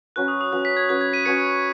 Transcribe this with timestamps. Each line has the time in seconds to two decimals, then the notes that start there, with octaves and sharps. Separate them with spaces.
0.16 F#3 C#4 B4 F#6
0.28 D#6
0.41 D#6
0.52 F#3 C#4 B4 F#6
0.65 B6
0.77 G#6
0.89 F#3 C#4 B4 F#6
1.01 G#6
1.13 B6 D#7
1.25 F#3 C#4 B4 G#6 C#7